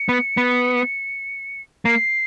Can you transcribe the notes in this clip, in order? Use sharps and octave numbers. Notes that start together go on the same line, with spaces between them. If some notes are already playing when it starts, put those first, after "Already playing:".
Already playing: C#7
B3
B3
A#3 C7